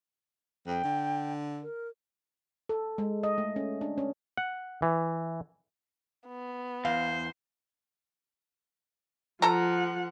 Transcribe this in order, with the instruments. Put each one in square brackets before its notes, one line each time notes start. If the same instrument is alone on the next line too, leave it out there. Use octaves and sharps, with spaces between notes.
[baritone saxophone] F2 [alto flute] G5
[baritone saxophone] D3
[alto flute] A#4
[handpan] A4
G#3
D#5
A3
C#4
D4
C#4
[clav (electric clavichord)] F#5
E3
[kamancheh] B3
[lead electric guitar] E2 [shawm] C5 [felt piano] F5
[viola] F3 F#5 [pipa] A4 A#5